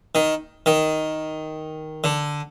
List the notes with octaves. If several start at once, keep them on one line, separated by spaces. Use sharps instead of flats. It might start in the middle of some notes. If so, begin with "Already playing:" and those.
D#3
D#3
D3